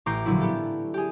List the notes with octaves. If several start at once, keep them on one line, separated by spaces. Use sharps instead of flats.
A1 A#5 C#6 D6 G6 C7
A#2 D3 F3 F#3 D4 E4
B3 G4 A4
G4 G#4